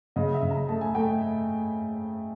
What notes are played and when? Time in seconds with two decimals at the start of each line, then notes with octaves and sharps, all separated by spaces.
0.16 C#3 D#5
0.34 E5
0.43 C#3
0.51 A#5
0.69 A3 A5
0.81 G#5
0.95 A3 G5